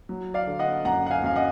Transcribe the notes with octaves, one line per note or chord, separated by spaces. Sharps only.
F#3
D5 F5
D3
D#5 F#5
F#2 F#5 A#5
F#5
F5 G#5
F#2 F5
D#5 F#5